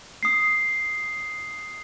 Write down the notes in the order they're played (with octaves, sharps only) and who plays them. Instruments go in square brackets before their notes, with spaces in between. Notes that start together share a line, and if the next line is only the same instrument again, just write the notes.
[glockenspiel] D#6 C7